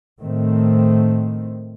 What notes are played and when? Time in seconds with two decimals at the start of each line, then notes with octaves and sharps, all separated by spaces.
0.22 A2 D#3 A3 C4